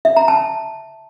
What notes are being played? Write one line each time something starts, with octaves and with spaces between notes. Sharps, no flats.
E5
A#5
A5